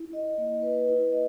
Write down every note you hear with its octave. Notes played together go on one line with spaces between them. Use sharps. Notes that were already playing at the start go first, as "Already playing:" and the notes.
Already playing: E4
D#5
A#3
B4
E4
D#5